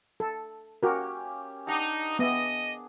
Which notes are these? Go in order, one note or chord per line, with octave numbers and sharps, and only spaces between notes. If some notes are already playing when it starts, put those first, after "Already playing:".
A4
A#3 C#4 F#4 G4 A#4
D4 D#4 G4 F#5
B3 G#4 D#5 E5